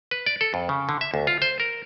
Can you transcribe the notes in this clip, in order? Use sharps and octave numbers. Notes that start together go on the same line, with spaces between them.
B4
D5
A4
F2
C#3
D3
E5
D2
F4
C5
A#4